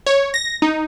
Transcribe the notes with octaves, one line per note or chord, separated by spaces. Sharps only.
C#5
A#6
D#4